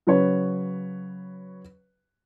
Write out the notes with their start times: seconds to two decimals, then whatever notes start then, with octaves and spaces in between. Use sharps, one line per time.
0.07 C#3 F#3 B4 C#5